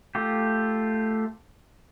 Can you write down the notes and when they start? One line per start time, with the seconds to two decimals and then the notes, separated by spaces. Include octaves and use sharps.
0.15 A3 F4 G4